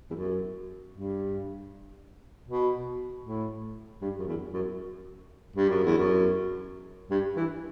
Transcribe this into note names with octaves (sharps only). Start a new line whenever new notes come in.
E2
F#2
G2
B2
A2
G2
F#2
E2
F#2
G2
F#2
E2
F#2
G2
E3